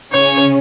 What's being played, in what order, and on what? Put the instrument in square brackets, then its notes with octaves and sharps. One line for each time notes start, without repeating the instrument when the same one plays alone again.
[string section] C#3 C#4 [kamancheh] C#5